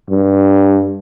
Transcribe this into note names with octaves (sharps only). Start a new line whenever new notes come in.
G2